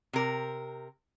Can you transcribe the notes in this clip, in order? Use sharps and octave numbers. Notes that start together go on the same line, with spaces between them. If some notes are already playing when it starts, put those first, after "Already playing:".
C3 A#4